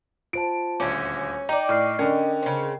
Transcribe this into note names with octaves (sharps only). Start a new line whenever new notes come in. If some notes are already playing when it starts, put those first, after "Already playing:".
F4 C5 A5 D7
D#1 D2 C#4 D6 G#6
D#4 D5 G5 A#5
A2 C#6 F6 C7
D3 C#4 A#4 D#5 G5
C#3 C4